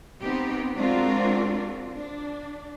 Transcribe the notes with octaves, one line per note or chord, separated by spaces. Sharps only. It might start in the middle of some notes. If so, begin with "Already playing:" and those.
B3 C4 D#4 G4
G#3 C4 D4 F4 F#4 A#4
D4